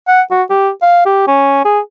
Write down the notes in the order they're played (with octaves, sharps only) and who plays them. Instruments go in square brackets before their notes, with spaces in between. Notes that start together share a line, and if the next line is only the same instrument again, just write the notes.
[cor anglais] F#5
F#4
G4
F5
G4
C#4
G#4